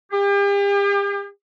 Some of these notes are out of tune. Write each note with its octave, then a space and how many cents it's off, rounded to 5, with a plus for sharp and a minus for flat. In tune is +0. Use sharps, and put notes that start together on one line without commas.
G4 +40